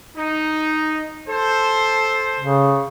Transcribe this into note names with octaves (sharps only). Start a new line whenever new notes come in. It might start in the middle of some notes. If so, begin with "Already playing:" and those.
D#4
A4 C5
C#3